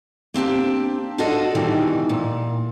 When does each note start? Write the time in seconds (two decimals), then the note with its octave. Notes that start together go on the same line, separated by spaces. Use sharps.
0.34 A#3 C4 D4 G4
1.18 D4 F4 F#4 A4 D5 D#5
1.55 B2 D#3 E3 G3
2.09 A#2